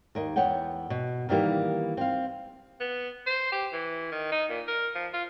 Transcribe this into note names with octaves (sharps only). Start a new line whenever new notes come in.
D#2 A#4 D#5
E2 B3 C#5 F#5 G5
B2
D#3 E3 G3 A#3 B3
C4 F5
B3
C5
G4
E3
D#3
D#4
A#2
A#4
F3
F4